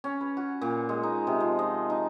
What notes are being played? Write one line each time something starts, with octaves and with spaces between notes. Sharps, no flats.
C#4
B4
F#4
A#2
G#3
D#4
C3
F3
D#5
D#4